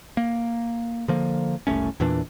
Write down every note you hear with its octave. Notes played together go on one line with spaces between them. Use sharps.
A#3
D3 F3 A#3
F#1 C2 A3 C#4
E2 A#2 E3 D4